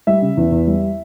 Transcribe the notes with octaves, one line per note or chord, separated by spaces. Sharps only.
G3 E5
C#3
E2
E2
G3